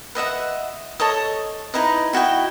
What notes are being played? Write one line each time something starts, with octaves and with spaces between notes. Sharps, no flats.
B4 D#5 E5 F#5
A4 C#5 D#5 D#6
D#4 E4 B4 D#5
E4 F#4 D#5 G5